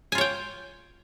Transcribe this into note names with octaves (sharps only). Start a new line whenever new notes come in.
F4 C#5 G5 G#5